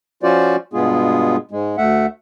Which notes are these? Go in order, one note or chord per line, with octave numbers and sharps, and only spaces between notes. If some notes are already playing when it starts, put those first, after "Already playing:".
F3 C#4 F4 F#4 C5 D5
G2 B2 G#3 B3 F4 G#4
G#2 G#3
D2 A3 E5 F#5